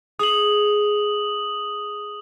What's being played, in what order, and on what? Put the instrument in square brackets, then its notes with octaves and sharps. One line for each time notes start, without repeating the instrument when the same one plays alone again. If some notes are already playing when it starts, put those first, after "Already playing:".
[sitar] G#4 [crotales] D#6 F#7